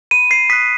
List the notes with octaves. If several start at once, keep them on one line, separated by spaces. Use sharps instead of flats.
B5 D#7
C7
D#6 F#6 B6